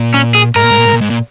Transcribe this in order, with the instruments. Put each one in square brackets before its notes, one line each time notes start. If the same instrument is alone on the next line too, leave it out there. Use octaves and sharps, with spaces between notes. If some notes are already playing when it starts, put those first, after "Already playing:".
Already playing: [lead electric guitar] A#2
[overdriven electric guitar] C#4
G#4
[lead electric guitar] G#2 [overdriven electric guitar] A#4
[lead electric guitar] A#2
G#2
A#2
G#2
A#2
G#2
A#2